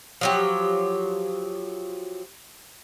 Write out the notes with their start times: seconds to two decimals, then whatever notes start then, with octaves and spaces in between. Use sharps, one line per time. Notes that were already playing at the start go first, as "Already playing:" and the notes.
0.21 F3 F#3 G4